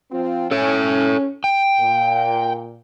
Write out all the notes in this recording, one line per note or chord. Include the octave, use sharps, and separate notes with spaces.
F3 C4 F4
C#4 A4 C#5
G5
A#2